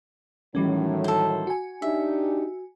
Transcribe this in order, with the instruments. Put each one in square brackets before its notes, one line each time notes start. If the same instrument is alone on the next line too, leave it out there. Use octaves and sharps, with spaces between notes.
[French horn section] A2 D#3 F#3 [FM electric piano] E3 G3 C#4
[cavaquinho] A4 C5
[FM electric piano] F#4 G#5
[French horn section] D4 D#4 G4 [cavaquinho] E5